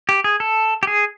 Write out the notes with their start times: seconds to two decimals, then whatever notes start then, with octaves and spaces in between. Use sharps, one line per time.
0.09 G4
0.24 G#4
0.40 A4
0.83 G4
0.87 G#4